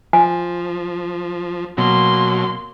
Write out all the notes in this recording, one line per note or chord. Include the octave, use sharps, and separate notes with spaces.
F3 G#5
B2 F#3 A#3 C6